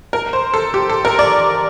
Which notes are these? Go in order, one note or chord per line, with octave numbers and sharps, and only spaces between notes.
A#4
C5
A4
G4
A4
A#4
D5